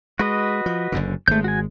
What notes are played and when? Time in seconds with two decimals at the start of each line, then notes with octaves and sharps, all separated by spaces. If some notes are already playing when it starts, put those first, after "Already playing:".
0.19 G#3 F#4 B4 D#5
0.66 F3
0.92 F#1 F#2 D3
1.28 G#1 G#3 A3 G6
1.44 F#4 G#5